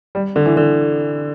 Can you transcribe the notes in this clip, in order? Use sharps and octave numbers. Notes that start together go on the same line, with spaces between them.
G3
D3
E3
D3